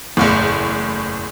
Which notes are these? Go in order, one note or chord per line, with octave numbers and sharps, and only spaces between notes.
F#1 E2 A2